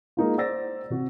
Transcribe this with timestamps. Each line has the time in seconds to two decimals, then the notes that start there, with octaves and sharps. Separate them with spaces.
0.17 G#3 A#3 D#4 F4
0.38 C5 D5 E6 A6 A#6
0.90 C3 F#4